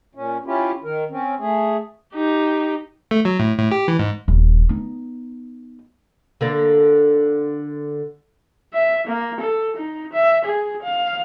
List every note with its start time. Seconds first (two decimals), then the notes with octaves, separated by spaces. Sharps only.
0.15 A#2 C#4
0.46 C#4 E4 F4 G4
0.84 D#3 A#4
1.10 C4 C#4
1.39 A3 G#4
2.14 D#4 G4
3.11 A3
3.25 F#3
3.39 A2
3.58 A2
3.71 G4
3.88 E3
3.99 G#2
4.28 D#1
4.69 B3 D#4
6.41 D3 A#3 D4
8.73 E5
9.07 A#3
9.40 A4
9.76 D#4
10.13 E5
10.45 G#4
10.82 F5